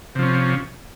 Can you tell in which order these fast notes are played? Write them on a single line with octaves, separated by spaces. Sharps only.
C3 F3 C#4